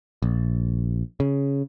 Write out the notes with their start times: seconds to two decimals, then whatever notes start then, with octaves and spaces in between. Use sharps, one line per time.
0.22 A#1
1.20 C#3